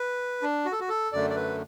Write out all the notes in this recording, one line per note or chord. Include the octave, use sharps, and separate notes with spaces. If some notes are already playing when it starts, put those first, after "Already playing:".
Already playing: B4
D4
F#4
A4
F#4
A4
F#2 D3 A3 D5
D5
B4